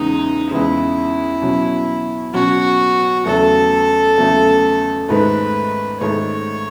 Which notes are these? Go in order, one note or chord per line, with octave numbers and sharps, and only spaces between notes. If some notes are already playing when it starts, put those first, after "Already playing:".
Already playing: E2 C#3 E3 G#3 D#4
E2 C#3 E3 G#3 E4
B2 F#3 C#4
B2 F#3 C#4 F#4
E2 C#3 F#3 A3 E4 A4
E2 C#3 F#3 A3 E4
G#2 D#3 A3 B4
G#2 D#3 A3 C#5